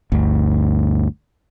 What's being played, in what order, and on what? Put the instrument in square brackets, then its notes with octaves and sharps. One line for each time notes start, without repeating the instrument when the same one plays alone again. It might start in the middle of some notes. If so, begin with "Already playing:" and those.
[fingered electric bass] G1 D2